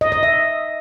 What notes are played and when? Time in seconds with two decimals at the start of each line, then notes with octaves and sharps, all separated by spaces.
0.01 D#5
0.12 D#5
0.23 E5